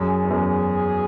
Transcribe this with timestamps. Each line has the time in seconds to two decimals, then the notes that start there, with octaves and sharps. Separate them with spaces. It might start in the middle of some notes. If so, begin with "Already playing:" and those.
Already playing: F#2 G#4
0.24 E2
0.30 F#2